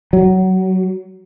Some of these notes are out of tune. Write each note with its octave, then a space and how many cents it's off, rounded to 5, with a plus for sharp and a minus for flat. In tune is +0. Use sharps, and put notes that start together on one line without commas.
F#3 +20